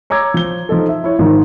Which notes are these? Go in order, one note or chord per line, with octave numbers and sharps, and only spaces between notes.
C#5 A#5 D6 E6 G#6
F3 G7
F3 D#4 A4
E5
E4 C#5
G#2 D#3 F3